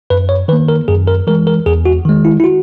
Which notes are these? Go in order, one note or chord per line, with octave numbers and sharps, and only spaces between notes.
F#2 B4
C#5
D#3 A#3 B4
A#4
F#2 G#4
A#4
E3 G#3 A#4
A#4
E2 G#4
F#4
D#3 G#3
E4
E4
F#4